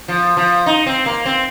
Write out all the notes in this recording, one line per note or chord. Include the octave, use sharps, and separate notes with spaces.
F3
F3
D#4
C4
A#3
C4